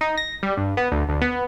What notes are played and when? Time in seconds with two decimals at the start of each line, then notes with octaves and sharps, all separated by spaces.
0.01 D#4
0.17 A#6
0.43 G3
0.57 G2
0.77 B3
0.92 D2
1.09 D2
1.21 B3